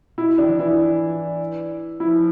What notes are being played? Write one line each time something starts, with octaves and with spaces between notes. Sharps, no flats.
B2 E4
D#3 D4
F3
E3 E4
F3 E4